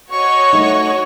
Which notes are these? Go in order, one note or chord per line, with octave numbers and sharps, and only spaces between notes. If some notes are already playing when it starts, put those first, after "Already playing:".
F#4 C#5 D#5 C#6
A3 D#4